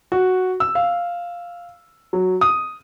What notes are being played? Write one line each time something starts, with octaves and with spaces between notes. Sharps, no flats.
F#4
E6
F5
F#3
D#6